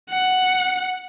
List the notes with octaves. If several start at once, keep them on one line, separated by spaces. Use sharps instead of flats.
F#5